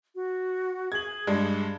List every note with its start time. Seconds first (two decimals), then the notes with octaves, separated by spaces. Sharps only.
0.15 F#4
0.92 G#4 G#6 F#7
1.27 G2 G#3 D4